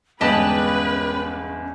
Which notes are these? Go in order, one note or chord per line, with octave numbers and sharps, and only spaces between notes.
G1 E2 G#2 C#4 G4 B4 D#5 A5